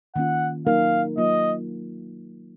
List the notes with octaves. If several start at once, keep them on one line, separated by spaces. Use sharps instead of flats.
D#3 A#3 C#4 F4 F#5
F#3 A#3 D#4 A#4 F5
F#3 A#3 F4 D#5